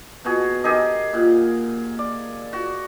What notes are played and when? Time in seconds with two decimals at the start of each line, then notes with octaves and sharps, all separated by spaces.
0.24 B2 F#4 G#4
0.64 G4 G#4 A#4 D#5
1.13 A#2 F5 F#5
1.99 D5
2.53 F#4